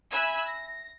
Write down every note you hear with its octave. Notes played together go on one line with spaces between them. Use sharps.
E5 G#5 B5 E6 F#6 G#6
A#6